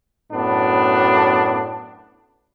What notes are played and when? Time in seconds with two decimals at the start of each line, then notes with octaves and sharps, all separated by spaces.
0.32 F#2 A2 B3 D4